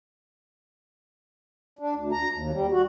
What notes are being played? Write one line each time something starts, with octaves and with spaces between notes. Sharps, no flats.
D4
D2
A#5
D#2
G3
F#4